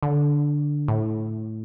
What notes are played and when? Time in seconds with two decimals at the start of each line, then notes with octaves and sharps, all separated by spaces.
0.02 D3
0.88 A2